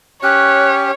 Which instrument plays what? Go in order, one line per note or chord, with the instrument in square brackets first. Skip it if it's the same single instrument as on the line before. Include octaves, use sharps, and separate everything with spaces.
[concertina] C#4 G4 [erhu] C#5 [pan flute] F#6